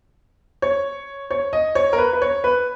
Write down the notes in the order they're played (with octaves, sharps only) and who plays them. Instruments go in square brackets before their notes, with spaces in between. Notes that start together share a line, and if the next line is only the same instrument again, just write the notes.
[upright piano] C#5
C#5
D#5
C#5
A#4
B4
B4
C#5
B4